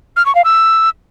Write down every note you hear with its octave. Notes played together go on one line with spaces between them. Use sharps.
F6
C#6
F5
E6